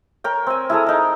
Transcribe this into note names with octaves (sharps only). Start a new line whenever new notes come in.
A#4 C#5 G5
C4 G#5
E4 G#4 A4 A#5
D#4 A#4